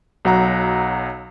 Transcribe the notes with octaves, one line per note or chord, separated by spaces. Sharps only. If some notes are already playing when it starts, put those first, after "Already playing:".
B1 F#3 F#5 A#5